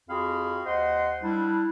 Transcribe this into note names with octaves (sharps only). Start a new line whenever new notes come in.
F2 F4 F#4 G#4 F5 B5
D#2 C5 D#5 F#5 C6
G3 D4 E4